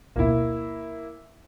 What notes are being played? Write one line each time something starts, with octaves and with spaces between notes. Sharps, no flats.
A1 D2 B2 A#3 E4